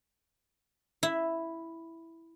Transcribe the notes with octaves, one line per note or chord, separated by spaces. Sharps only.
E4